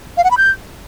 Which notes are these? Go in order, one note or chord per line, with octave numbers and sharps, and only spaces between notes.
F5
F#5
B5
G6